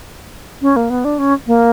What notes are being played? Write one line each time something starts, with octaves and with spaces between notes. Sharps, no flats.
C#4
A#3
B3
D4
C#4
A#3